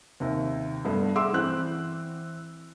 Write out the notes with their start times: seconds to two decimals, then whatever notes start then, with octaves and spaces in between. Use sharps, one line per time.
0.20 D#2 C3
0.85 G2 A3 B3
1.15 G#4 E5 F#5 C6 D6 E6
1.33 E3 C4 F#6